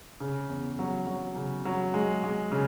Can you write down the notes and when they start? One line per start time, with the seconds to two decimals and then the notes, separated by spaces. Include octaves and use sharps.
0.20 C#3
0.49 E2
0.79 F#3
1.07 F#3
1.36 C#3
1.65 F#3
1.94 G#3
2.24 G#3
2.52 C#3